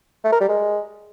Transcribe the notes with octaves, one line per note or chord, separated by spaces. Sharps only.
A3
A#4
G3
G#3